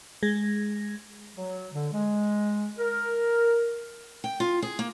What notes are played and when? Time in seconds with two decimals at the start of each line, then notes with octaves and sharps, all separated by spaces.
0.23 G#3 G#4 G#6 A#6
1.37 F#3
1.73 D3
1.92 G#3
2.79 A#4
4.24 G5
4.40 F4
4.62 G#4
4.79 A#3